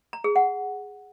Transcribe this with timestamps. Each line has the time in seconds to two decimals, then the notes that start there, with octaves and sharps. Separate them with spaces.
0.13 A#5
0.24 G#4
0.36 F#5